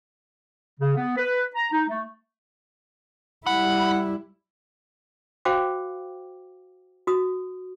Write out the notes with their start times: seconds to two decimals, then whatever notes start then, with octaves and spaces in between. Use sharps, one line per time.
0.80 C#3
0.96 B3
1.17 B4
1.55 A#5
1.72 D#4
1.89 A3
3.47 G3 E4 F#5 B5
5.45 F#4 C5 F5 G5 D6
7.07 F#4 D#6